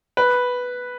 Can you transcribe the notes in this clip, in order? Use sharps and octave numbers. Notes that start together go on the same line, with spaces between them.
B4